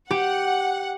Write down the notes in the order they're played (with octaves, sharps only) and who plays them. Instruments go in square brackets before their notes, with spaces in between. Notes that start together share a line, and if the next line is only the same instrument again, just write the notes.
[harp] G4 [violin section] F#5